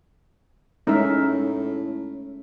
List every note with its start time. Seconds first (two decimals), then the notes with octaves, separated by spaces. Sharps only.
0.87 A2 G#3 C#4 D#4 A#4 E5